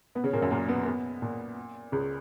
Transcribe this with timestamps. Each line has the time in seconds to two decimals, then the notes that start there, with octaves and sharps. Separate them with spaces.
0.15 B2 B3
0.24 C#3 C#4
0.33 A#2 A#3
0.41 F#2 F#3
0.51 A#2 A#3
0.68 B2 B3
0.86 B2 B3
1.22 A#2
1.92 C#2 C#3